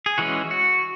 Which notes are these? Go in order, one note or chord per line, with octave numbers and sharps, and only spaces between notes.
G#4
E3 G#3 C#4 F#4
F#4